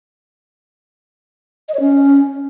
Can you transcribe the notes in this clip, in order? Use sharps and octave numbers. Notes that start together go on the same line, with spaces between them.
D#5
C#5
C#4